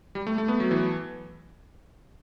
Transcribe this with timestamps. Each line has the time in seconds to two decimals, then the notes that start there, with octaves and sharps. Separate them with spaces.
0.15 G3
0.27 A3
0.38 A3
0.48 B3
0.60 F#3
0.71 E3